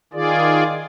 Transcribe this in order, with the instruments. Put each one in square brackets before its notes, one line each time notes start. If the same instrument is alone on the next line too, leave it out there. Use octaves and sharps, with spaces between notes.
[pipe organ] D#3 F4 G#4 D5